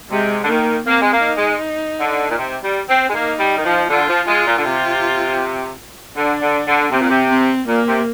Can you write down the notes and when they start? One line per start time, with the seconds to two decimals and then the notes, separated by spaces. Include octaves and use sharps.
0.10 C3 G#3
0.44 D3
0.48 D#3 A#3
0.87 A#3 C4
1.02 G#3
1.12 A#3
1.24 D#4
1.37 G#3
2.00 D3
2.30 A#2
2.38 C3
2.63 G3
2.88 C4
3.08 G#3
3.13 A#3 D#4
3.39 G3
3.57 D#3
3.64 F3
3.89 D3 F4
4.08 F3
4.27 G#3 F4
4.46 A#2
4.57 D3
4.64 C3 F4
6.16 D3 D4
6.41 D3
6.67 D3
6.92 C3 C4
7.01 A#2
7.09 C3
7.29 C4
7.67 A#2 A#3
7.87 C3